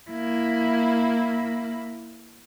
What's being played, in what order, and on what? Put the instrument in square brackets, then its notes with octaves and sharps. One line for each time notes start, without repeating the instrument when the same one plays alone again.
[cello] A#3 E4